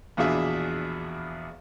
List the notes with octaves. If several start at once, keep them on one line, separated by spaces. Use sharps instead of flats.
A#1 E2 B2 D4 G#4 E5